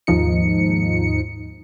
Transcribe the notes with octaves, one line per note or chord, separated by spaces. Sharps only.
D#2 G#2 F3 D#4 C#7